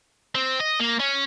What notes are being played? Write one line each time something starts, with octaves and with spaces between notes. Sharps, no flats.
C4
D#5
A#3
C#4